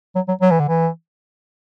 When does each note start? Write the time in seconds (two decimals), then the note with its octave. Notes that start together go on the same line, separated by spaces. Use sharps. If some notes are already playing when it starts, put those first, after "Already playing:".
0.15 F#3
0.28 F#3
0.41 F#3
0.51 E3
0.60 D3
0.68 E3